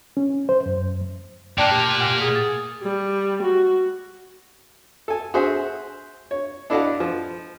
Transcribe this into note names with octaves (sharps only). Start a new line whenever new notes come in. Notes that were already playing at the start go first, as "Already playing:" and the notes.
C#4
C5
F#2
A#2 A#3 D5 G5 A5 F#6
G4
F#5 G#5 F6
G#4
A6
G3
F#4
A4 G#5
F#4 G#4 C5 E5
C#5
D4 E4 A4 D#5 F5 F#5
F3